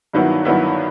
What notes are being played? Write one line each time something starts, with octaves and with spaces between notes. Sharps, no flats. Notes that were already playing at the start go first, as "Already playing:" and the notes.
G2 D#3 F#3 B3 E4
G2 D#3 F#3 B3 E4